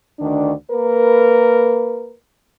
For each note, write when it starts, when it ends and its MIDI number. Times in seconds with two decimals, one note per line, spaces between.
0.19 0.52 38
0.19 0.52 51
0.19 0.52 62
0.71 2.15 58
0.71 2.15 70
0.71 2.15 71